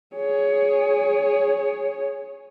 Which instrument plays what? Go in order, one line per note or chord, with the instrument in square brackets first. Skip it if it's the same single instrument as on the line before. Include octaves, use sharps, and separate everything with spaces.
[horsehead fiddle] G#4 C#5